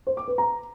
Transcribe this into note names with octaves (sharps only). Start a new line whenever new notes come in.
C5
D6
B4
A#5